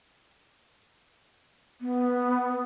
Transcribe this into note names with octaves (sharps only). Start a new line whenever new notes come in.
B3